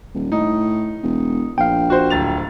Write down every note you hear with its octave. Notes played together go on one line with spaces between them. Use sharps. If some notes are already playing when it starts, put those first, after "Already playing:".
D#1
A2 D#4
E1
A#1 F5 G5
F#4 C5
D1 A6 F7